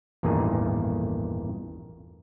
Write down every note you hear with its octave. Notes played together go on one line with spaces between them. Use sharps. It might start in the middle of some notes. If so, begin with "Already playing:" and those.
A1 E2 G2 A#2 D#3 G#4